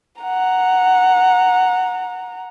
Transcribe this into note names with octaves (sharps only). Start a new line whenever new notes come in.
F#5 A#5